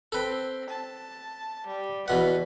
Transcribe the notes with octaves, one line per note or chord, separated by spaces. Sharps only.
C4 A4 B4
A5
G3
E2 B2 B4 F#5